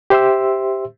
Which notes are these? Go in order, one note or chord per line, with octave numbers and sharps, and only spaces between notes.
G4 C5 E5 C6 E6